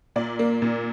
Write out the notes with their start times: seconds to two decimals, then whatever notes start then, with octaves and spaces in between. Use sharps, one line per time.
0.16 A#2 D5
0.39 A#3
0.62 A#2